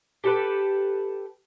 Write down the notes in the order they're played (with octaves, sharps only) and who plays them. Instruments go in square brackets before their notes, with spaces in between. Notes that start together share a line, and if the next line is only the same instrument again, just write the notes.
[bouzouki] G4 A4 B4